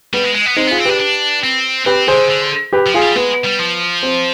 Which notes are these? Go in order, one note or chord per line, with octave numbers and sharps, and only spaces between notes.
G3 B3
G#3
G#3
B3
G#3 C4 D#4
B3 F4 G#4
C4
D4 G4 B4
D4
C4
C4 G4 B4
D3 G#4 C5
D3
G4 B4
F3
F4 G#4
G3
G#3 B3
G3
F3
C4